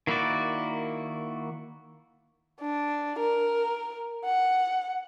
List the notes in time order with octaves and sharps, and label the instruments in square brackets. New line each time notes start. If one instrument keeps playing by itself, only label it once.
[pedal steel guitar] D#3 A#3 E4 F#4 D5
[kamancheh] D4
A#4
F#5